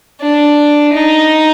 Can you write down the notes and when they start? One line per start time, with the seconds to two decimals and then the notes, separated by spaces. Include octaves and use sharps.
0.21 D4
0.94 D#4